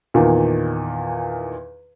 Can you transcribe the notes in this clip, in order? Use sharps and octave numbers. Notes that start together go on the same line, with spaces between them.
E2 A#2 D#3